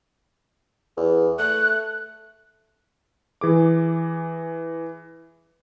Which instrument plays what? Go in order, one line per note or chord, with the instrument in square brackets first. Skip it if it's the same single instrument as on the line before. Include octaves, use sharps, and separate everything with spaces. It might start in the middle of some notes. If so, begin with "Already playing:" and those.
[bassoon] E2
[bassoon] A3 [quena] F#6
[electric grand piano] E3 G#4 D6